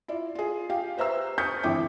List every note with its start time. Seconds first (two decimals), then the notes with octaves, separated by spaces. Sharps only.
0.08 E4 F4 D5
0.35 F4 G#4
0.70 G4 F5 G5
0.98 B4 C5 E5 A#5 E6
1.38 C#6 D#6 F6 G6 B6 C#7
1.63 G#1 D2 E3 E4 G5 D6